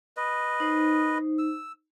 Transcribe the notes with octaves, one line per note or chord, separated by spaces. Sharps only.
B4 D#5
D#4 C5
E6